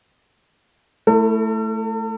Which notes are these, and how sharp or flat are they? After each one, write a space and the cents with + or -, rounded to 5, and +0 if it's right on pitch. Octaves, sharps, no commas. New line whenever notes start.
A3 +0 E4 +0 A4 +45